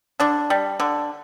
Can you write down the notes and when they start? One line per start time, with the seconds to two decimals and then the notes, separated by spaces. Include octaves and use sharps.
0.20 D3 D4
0.50 G3
0.80 D3